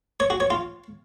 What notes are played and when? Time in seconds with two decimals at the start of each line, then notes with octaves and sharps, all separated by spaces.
0.20 C#5
0.30 F#4
0.40 C#5
0.50 F4